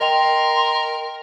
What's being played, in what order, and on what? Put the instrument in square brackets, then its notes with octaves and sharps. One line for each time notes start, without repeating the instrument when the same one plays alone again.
[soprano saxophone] A#4 [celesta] D#5 G5 F7 [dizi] C6